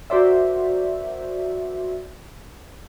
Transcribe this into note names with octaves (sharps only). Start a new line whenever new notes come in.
F#4 A#4 C5 D5 E5